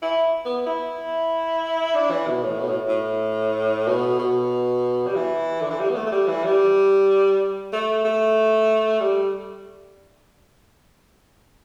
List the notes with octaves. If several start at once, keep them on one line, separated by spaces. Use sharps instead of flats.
E4
B3
E4
D4
E3
B2
A2
B2
A2
A2
B2
B2
G3
E3
D3
E3
G3
B3
A3
A3
G3
E3
G3
A3
A3
G3